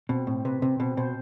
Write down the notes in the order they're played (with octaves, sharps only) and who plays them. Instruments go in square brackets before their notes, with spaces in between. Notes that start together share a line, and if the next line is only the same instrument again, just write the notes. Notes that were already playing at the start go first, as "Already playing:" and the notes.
[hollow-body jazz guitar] B2 [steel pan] C4
[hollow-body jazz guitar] A2 [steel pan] C4
[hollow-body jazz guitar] C3 [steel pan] B4
[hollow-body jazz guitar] C3 [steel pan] C4
[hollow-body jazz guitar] B2 [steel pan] C4
[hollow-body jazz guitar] B2 [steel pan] C5